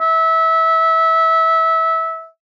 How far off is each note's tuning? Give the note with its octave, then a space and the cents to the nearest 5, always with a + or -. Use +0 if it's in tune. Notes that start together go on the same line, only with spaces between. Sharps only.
E5 -20